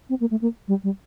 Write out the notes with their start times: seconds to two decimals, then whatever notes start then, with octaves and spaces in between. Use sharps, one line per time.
0.09 C4
0.20 A#3
0.31 A3
0.41 A#3
0.68 G3
0.84 G3